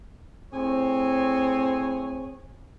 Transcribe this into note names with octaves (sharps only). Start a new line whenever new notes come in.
A2 C4 G#4 C#5